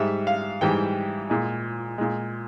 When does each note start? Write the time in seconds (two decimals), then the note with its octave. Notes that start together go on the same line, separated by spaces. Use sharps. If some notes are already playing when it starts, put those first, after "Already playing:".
Already playing: G#2 G3 E5
0.27 F5
0.61 G#2 E3 G3 G5
1.30 A#2 G#3
1.98 A#2 G#3